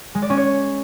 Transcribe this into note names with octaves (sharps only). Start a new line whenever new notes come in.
G#3
D5
C#4
C#5